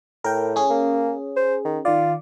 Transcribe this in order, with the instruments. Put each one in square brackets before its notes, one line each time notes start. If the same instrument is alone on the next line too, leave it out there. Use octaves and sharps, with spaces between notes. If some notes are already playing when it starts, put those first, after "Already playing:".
[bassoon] A2 [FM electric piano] A#4 G5
[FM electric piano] C#4 G#4
[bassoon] A#3
C5
D#3
[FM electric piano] D#3 D5 [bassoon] F4